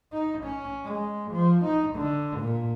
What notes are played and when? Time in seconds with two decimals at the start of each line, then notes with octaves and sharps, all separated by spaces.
0.13 D#4
0.45 C#4
0.85 G#3
1.31 F3
1.65 D#4
1.96 D3
2.40 A#2